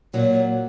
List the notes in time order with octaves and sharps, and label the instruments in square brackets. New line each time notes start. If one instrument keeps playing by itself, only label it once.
[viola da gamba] A#2 [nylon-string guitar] F#3